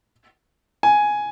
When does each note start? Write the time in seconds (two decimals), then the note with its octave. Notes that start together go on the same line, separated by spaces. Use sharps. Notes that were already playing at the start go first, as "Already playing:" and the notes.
0.83 G#5